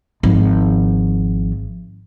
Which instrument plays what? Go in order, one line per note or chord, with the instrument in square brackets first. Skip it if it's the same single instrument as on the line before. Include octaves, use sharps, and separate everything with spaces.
[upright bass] G#1 F3